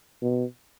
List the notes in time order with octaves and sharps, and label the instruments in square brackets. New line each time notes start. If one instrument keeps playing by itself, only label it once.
[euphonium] B2